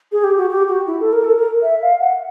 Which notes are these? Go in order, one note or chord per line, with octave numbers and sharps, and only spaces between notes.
G#4
G4
F#4
G4
F#4
E4
A4
A#4
A4
A#4
E5
F5
F#5